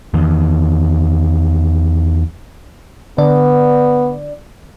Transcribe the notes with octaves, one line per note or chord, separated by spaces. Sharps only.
E2 D#3
D3 B3 D5